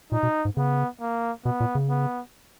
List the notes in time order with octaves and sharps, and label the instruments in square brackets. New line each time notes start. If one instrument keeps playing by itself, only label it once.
[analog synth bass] A#2 [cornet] D#4
[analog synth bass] B2
G#2
[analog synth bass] C#3 [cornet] B3
[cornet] A#3
[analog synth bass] B2 [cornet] B3
[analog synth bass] A#2
C#3
[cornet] B3